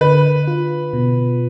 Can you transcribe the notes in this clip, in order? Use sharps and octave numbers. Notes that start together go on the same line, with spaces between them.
D3 B4
F4
B2